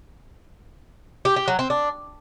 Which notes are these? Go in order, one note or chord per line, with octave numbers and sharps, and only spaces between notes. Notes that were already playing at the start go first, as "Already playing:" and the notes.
G4
G4
F#3
C4
D4